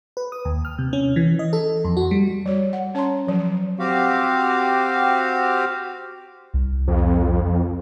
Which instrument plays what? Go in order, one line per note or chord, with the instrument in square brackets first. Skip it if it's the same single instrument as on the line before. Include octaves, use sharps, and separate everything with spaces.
[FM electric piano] B4
D#6
D#2
F6
C3
C#4
E3
D#5
A4
F2
F#4
G3
[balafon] G3 C#5
F#5
C#4 C#5 A5 A#5 C6
F3 F#3
[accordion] C4 F#4 G4 F5
[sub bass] C2
[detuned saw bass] F2